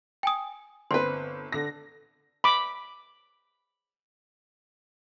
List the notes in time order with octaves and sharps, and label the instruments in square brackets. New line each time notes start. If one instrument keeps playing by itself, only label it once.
[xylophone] G5 G#5 D#6
[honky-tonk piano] G1 [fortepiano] C4 B4 [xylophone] C6
[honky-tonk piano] D3 A#6
[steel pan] B5 D6